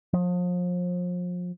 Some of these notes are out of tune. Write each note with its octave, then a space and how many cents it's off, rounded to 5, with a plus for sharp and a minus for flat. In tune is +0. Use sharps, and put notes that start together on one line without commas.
F3 +35